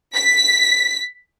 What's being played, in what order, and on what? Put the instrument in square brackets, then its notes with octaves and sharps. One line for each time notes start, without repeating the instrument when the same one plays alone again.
[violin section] B6